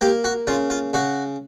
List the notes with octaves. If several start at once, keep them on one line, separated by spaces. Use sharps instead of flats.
A#3 G4
F#4
C#3 F4
F4
C#3 F#4